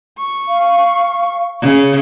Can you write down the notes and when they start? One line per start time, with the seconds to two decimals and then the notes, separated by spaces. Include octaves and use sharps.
0.19 C#6
0.49 F5
1.62 C#3